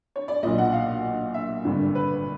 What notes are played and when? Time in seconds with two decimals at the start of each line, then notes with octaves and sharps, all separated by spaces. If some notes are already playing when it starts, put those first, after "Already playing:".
0.16 C#5
0.28 D5
0.43 B1 A#2 D#5
0.58 F#5
0.73 F5
1.34 E5
1.64 G#1 G2 D3
1.95 B4